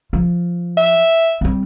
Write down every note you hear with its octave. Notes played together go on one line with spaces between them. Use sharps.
F3
E5
G3 C4